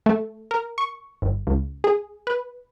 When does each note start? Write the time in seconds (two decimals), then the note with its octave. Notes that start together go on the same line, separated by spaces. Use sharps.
0.06 A3
0.51 A#4
0.78 C#6
1.22 G1
1.47 C#2
1.84 G#4
2.27 B4